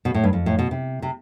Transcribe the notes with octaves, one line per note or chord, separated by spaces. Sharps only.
B2
A2
G2
F2
A2
B2
C3
C3